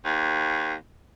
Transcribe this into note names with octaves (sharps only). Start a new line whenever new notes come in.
D#2